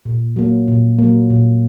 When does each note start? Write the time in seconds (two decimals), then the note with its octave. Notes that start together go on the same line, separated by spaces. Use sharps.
0.05 A#2
0.36 F#3 A#3
0.68 A#2
0.99 F#3 A#3
1.30 A#2